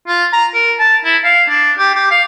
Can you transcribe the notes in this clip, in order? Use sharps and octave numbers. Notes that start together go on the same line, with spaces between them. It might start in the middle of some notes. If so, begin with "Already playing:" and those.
F4
A#5
A#4
A5
E4
F5
D4
G4
G4
F5